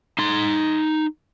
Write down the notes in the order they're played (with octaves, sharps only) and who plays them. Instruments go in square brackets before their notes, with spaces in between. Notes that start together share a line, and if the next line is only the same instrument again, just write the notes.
[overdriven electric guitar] D#4 C6